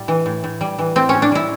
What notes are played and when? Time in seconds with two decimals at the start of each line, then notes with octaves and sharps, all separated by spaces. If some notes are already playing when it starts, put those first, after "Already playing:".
Already playing: A2 G3
0.08 E3
0.26 A2
0.44 A2
0.61 G3
0.79 E3
0.96 A2 C4
1.09 A2 C#4
1.22 D4
1.32 G3 E4